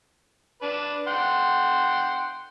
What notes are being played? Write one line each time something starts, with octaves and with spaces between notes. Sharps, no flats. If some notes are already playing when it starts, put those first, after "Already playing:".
D4 B4
F#5 G5 C6